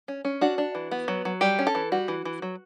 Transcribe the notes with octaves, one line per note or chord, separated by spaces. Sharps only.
C#4
C#4
D4 F#4
D4
E3
B3
F#3
F#3
G3 G4
C#4
A4
E3
G3 F#4
E3
E3
F#3